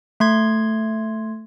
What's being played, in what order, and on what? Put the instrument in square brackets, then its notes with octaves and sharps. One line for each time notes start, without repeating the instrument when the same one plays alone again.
[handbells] A3 C6 G#6